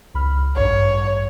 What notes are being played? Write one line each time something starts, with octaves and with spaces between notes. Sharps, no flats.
C#2 B5 F6
A1 G2 C#5